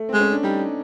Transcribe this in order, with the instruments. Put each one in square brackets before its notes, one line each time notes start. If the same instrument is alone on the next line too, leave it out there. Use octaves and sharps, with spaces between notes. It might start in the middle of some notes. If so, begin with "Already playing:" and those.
Already playing: [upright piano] A3
[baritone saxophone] G#3 [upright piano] C4
[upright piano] C#4
D4
[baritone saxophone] G3 [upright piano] D#4